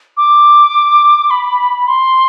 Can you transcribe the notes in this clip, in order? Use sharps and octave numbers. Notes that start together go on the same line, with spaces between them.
D6
B5
C6